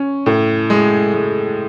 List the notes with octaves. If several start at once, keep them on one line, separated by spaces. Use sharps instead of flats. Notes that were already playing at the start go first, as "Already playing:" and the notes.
Already playing: C#4
A2
G#3
G#3